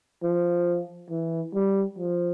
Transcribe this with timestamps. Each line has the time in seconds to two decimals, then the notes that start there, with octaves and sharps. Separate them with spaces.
0.23 F3
1.11 E3
1.55 G3
1.99 F3